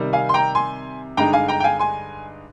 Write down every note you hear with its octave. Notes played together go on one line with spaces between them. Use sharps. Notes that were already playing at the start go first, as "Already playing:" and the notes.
Already playing: C3 D#3 G3
F5 G#5
C6
G5 A#5
G#5 C6
G2 D3 G#3 D#4 G5 A#5
F5 G#5
G5 A#5
G5
F5 G#5
G#5 C6